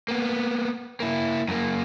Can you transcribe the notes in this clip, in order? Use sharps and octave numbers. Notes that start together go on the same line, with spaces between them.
A#3 B3
A#3 E4
F#2 A#3